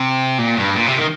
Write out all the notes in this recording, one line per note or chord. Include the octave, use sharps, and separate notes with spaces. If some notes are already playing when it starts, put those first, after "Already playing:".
Already playing: C3
A#2
G2
A#2
C3
D#3